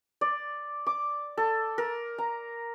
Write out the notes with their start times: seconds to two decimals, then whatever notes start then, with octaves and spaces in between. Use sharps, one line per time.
0.21 D5
0.87 D6
1.37 A4
1.78 A#4
2.18 A#5